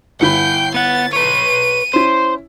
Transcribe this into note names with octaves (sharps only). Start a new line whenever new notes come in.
G1 E4 F#5 G5 B5 G6 C7
B3 F#5 A6
B4 C#5 D#7
C#4 E4 C5